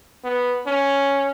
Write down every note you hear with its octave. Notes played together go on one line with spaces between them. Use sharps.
B3
C#4